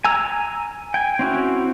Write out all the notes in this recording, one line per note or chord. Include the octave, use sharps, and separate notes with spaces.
G#5 A#5 E6
G5 G#5
C4 C#4 E4 F#4